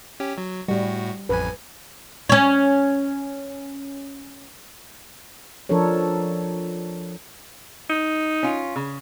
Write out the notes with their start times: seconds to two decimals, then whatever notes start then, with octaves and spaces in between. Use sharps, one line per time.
0.20 C#4 G4
0.38 F#3
0.68 A2 G3 F#4
1.29 A1 F2 B4 G#5
2.29 C#4 C#5
5.69 F3 D4 A4 A#4 C#5
7.90 D#4
8.43 C#4 F4
8.76 C#3